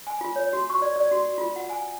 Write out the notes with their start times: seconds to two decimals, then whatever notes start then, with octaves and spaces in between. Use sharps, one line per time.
0.07 G#5
0.21 F4
0.36 C#5
0.53 F#4
0.70 C#6
0.82 D5
0.96 D5
1.11 F#4
1.38 F4
1.56 F#5
1.70 G#5